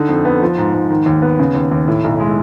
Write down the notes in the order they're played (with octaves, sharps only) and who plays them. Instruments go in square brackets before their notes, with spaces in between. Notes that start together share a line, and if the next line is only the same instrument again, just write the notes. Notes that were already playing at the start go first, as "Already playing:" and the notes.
Already playing: [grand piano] D3 D#4
F2
B3
F3
G#2
G#2
D#3
D#2
B3
C#3
D#2
D#2
A2
B1
G#3